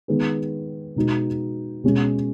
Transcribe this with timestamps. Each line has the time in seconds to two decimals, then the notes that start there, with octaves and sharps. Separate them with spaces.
0.08 D#3 G#3 B3 G#4
0.96 B2 G#3 B3 D#4 F#4
1.84 B2 G#3 C#4